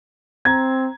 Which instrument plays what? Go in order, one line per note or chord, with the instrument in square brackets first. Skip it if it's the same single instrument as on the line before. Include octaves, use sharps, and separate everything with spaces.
[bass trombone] C4 [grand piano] A#5 G#6